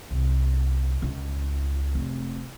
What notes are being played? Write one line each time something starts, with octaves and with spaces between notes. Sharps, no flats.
C2
C#2
F1